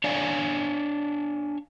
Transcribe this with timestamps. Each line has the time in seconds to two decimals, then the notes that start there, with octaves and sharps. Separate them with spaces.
0.04 D4 C#5 D5 F5 G#5